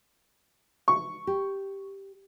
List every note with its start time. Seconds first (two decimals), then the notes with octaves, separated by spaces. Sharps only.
0.88 C#6
1.27 G4